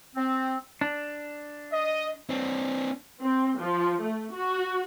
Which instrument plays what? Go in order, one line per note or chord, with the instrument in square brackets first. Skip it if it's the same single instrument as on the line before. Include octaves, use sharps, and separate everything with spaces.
[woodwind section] C4
[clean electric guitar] D4
[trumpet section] D#5
[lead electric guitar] C4 D4
[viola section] C4
F3
A3
F#4